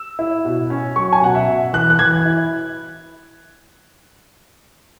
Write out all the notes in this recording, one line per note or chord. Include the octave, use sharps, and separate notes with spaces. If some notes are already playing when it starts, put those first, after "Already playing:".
Already playing: E6
E4
B2
C#4
F#3 C#6
G#5
B2 F#5
E5
B2
E3 F#6
F#6
E3 G#6
E4